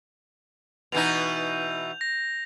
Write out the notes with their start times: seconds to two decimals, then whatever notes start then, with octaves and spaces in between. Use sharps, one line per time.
0.92 B2 E3 D#4 G6 F7
2.01 A#6